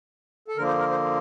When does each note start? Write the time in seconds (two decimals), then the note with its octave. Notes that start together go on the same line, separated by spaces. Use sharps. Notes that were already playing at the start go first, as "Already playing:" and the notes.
0.48 A4
0.57 D3 F3 A#3 A#4
0.68 C5
0.79 A#4
0.91 C5